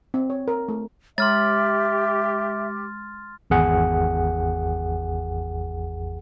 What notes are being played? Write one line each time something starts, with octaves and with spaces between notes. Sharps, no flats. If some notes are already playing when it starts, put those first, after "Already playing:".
C4
C#5
A#4
A3
G#3 G4 E5 C6 F6 A6
G#1 E2 G#4 F#5